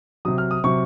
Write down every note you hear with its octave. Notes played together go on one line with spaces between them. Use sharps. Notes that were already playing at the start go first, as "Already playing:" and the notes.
C3 F#3 D#6
F6
D#6
C3 F#3 C#6